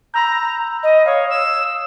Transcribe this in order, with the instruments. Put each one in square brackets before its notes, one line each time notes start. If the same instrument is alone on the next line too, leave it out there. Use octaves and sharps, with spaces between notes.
[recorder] A#5 [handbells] B5 E6 G6
[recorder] D#5
[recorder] C#5 [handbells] F5 D#6
[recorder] E6